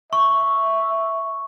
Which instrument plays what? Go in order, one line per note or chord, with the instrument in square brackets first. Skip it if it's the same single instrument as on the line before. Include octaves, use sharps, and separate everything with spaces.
[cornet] E5 [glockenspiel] C#6